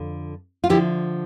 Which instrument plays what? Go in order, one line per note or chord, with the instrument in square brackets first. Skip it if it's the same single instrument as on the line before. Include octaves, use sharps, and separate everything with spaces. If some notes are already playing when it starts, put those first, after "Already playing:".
Already playing: [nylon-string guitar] F2 D3
F4
D3 F3 E4 G4